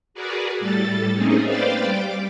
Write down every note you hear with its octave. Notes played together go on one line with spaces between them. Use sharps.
F#4 G#4 A#4 B4 D5
A2 G3 A4 A6
A3 A#3 C4 C#4 D#4 G#4
B4 C5 D5 F5 G5 A6
G3 D6